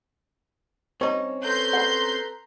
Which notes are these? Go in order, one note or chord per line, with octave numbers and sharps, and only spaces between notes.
G3 C4 C#4 D#4 C#5
A4 B4 A#5 C6 G6
F#5 B5